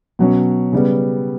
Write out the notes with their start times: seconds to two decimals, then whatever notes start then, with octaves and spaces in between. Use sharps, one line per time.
0.19 B2 F#3 C#4
0.73 C#3 G3 B3